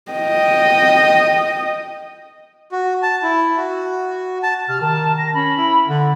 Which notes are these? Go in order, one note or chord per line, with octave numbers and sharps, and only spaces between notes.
D#5 G5
F#4
A5
E4
F#4
A5
C3 F6
D#3 A5
A#6
C#4 B5
E4
D3